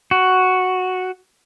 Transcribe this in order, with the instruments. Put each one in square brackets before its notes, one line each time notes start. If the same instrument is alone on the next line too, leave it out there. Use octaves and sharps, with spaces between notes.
[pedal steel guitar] F#4